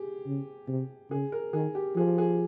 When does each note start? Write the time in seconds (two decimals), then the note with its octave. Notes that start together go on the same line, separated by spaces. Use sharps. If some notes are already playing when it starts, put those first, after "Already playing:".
Already playing: G4 G#4
0.26 C#3
0.68 C3
1.11 C#3 G#4
1.32 A#4
1.53 D#3 G#4
1.75 G4
1.96 F3 G#4
2.18 G#4